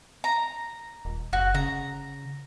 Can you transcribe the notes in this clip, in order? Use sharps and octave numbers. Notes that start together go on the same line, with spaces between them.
A#5
D#1
F#1 F#4
C#3 A#5